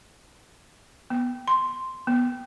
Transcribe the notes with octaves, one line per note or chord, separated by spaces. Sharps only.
B3
C6
B3